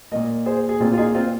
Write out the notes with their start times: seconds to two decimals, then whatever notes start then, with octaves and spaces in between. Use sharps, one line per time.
0.11 A#2 A#3 A#4 D#5
0.46 G#4 C5
0.69 G#4
0.80 A#2 A#3 C4 F4
0.93 F4
0.98 D#4 G#4
1.15 C4 F4